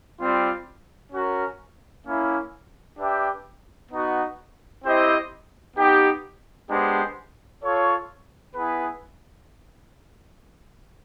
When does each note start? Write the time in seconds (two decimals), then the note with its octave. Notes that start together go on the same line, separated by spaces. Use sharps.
0.18 G3 C4 F4
1.12 C#4 F#4 A#4
2.05 A#3 C#4 E4
2.98 D4 G4 B4 E5 G5
3.91 B3 D#4 F#4
4.84 C4 E4 G4 C5 D#5
5.76 B3 D#4 G4
6.70 G#3 B3 D4 G4 C5
7.63 F4 A4 C#5
8.55 B3 E4 G#4 B4